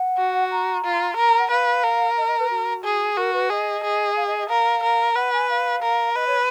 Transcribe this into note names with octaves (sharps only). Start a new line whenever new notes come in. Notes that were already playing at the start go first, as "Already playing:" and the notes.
Already playing: F#5
F#4
A#5
F4
A#4 A#5
A#5
F#5
B4 F5
A#4
D#5
D#5
B4
F#4
G#4
F#4 A#4
B4
G#4 D#5
G#4
F5
D#5
D#5
A#4 F5
A#4
B4 F#5
G#5
F5
A#4
B4 D#5
C#5